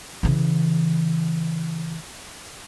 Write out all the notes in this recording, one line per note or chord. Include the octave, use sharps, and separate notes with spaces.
C#3 E3